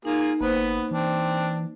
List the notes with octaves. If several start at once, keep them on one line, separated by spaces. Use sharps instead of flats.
A#3 D#4 F4 G#4
G1 A#3 B3 B4 C5
E3 C4 D4